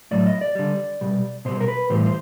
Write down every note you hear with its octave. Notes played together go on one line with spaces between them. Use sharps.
A2 F#3 D5
D#5
D5
D3 G3
B2 G3
B2 G3 C5
A#4
B4
A2 E3 G3 C5
C5